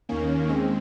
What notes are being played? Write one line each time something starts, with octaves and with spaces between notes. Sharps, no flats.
D#2 D#3 A#3 C#4
D#2 G#3 C4